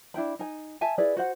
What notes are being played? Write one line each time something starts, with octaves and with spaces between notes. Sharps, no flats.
D4 E4 G5 B5
D#4 G#5
E5 G#5 A5
E4 G#4 B4 D5
F#4 C5 F#5